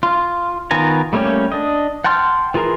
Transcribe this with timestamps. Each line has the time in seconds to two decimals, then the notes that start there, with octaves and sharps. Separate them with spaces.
0.03 F4
0.71 D#3 B3 F4 G#5 A#5
1.13 G3 A3 A#3 C#4 G4
1.52 D4 D#5
2.04 F#5 G5 A5 C6 F6
2.54 E3 F4 G#4 A#4